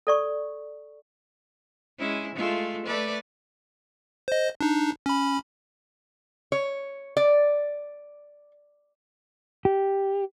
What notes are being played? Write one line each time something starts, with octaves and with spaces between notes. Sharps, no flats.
A4 D5 C#6
G#3 C#4 E4
G#3 A3 F4
A3 B4 D5
C5 D#5
D4 D#4
C#4 B5
C#5
D5
G4